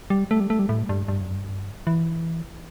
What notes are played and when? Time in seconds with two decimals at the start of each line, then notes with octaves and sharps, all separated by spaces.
0.10 G3
0.31 A3
0.40 G3
0.50 A3
0.59 G3
0.69 A2
0.89 G2
1.08 G2
1.21 F#2
1.34 G2
1.87 E3